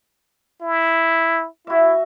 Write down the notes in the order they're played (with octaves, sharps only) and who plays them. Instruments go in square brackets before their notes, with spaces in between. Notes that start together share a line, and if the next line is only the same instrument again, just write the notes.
[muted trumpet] E4
[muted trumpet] E4 [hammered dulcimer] F#4 E5